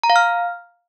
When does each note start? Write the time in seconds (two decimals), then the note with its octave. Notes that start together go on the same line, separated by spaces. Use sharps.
0.04 A#5
0.10 F5
0.16 F6